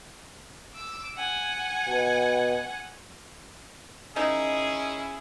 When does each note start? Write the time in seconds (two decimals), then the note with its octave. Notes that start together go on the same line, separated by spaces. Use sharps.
0.75 D6 E6
1.17 F#5 G#5
1.89 B2
4.16 D#3 G#3 C#4 D#4 E4 G#4